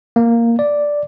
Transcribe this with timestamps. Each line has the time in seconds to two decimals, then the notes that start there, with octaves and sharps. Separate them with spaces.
0.16 A#3
0.59 D5